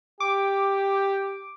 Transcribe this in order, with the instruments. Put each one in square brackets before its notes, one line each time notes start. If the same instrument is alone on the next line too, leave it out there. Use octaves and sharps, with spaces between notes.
[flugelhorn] G4 [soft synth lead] D6